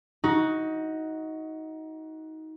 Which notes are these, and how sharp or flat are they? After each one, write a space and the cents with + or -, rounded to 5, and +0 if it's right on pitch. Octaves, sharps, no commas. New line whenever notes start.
D#4 +20 F#4 +0